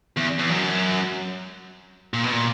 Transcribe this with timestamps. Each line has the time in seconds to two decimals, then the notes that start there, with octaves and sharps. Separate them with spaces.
0.17 E2
0.39 E2
0.50 F#2
2.14 A#2
2.24 B2
2.32 A#2